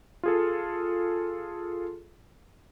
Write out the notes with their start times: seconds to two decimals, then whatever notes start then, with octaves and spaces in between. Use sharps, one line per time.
0.23 F4 G#4 A4